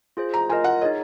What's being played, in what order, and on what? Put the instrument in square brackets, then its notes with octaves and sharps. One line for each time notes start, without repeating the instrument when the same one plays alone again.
[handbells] F4 G#4 C5
[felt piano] A#5
[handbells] F4 A#4 D#5 [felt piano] G#5
[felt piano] F#5
[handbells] D#4 G#4 C#5 [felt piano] D#5